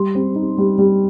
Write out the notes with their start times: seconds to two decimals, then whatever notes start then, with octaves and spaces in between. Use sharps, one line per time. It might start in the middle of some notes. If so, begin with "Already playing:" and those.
Already playing: G3 C6
0.15 C4
0.36 D#4
0.58 G3
0.78 G3